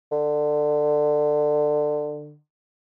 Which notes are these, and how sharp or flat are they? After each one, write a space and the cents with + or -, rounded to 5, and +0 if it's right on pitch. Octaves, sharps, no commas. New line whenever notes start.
D3 +20